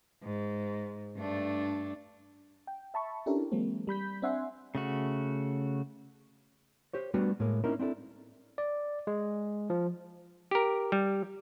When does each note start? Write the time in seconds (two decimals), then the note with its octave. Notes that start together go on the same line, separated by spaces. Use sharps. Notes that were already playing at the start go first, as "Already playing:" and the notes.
0.23 G#2
1.16 G2 A3 D4
2.67 G5
2.94 E5 A5 B5 C#6
3.26 C#4 D4 E4 G4 A4 A#4
3.52 E3 F#3 G#3 A#3 C4
3.87 G3 B5 G6 B6
4.22 C4 D4 E5 F#5 G#5 C6
4.75 C#3 A3 F#4
6.93 G4 C5 C#5
7.14 G3 A3 B3 D4 F#4
7.40 A2 G#3 A#3
7.64 A#3 C4 C#4 D#4 E4 A#4
7.79 C4 D4 E4 G4 A4
8.58 D5
9.07 G#3
9.70 F3
10.51 G4 A#4
10.92 G3